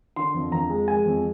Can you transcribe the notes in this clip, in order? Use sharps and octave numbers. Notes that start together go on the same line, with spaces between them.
D3 C6
F2
F2 A#5
G#3
G#3 G#5
F2